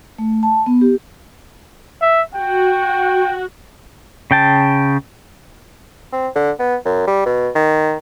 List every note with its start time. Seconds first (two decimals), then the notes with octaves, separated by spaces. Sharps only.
0.18 A3
0.43 A5
0.66 B3
0.81 G4
2.02 E5
2.35 F#4 G5
4.31 C#3 G5 A5
6.12 C4
6.36 D3
6.59 B3
6.85 F#2
7.07 G3
7.26 B2
7.55 D#3